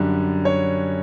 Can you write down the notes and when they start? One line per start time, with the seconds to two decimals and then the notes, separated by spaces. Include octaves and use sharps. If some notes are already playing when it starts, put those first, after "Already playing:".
Already playing: F#2 D3 G3
0.45 C#5